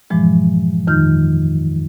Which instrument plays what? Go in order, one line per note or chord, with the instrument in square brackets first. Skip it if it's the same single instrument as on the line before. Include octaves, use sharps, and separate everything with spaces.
[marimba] G2 A#2 E3 F3 G#3
F2 D#3 D#4 F6 G6